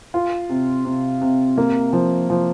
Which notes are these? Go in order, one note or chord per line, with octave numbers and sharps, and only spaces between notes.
F4
C3
C3
C3
A#3
F3
F3